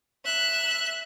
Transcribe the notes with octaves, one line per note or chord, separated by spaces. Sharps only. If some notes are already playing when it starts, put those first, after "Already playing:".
E5 F#6